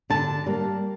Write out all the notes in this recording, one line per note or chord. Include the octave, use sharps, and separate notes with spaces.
D3 A5
G3 A#3